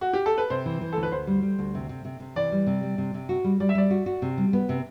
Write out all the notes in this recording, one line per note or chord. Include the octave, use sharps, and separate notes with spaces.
F#4
G4
A4
B4
C3 C5
E3
E3
D2 A4
B4
D2 C5
G3
G3
D2
C3
C3
C3
C3
E3 D5
G3
C3
G3
C3
C3
F#4
G3
G3 D5
E5
G3 D5
F#4
F#4
C3
G3
B3
C3